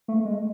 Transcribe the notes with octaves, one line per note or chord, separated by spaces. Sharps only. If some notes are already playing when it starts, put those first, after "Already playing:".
A3
G#3